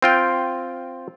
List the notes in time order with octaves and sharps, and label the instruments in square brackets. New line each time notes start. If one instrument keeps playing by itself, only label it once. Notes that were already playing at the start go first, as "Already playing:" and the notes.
[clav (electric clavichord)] C4 F4 G5